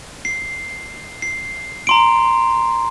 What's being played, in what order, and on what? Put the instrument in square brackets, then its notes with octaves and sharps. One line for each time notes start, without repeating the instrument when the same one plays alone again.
[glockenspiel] C7
C7
A#5 C6 D7